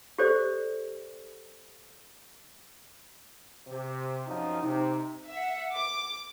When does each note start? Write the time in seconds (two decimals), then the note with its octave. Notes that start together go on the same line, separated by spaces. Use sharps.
0.18 G4 A4 C5 D5
3.68 C3
4.27 F#2 F3 D#4
4.62 C3 D#4
5.30 E5 F#5
5.74 D6